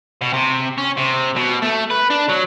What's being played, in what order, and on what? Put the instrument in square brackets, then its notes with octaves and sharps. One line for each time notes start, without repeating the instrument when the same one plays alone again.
[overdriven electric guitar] B2
C3
C#4
C3
B2
A3
B4
D4
F#3